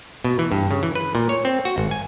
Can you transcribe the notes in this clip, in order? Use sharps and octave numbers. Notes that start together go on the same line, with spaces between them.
B2
E3
G2
C#3
E3
B4
A#2
C#5
C4
F#4
G#1
G#5